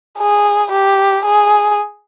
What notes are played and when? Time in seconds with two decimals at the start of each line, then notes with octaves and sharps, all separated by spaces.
0.19 G#4
0.72 G4
1.26 G#4